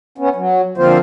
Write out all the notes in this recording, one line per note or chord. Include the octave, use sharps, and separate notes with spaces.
B3 C#4
F#3
D3 F3 A#3 C4 F4 C5